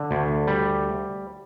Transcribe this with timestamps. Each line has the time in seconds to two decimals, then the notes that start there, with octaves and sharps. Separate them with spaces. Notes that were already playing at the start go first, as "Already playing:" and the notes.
Already playing: D3
0.11 D2
0.47 G3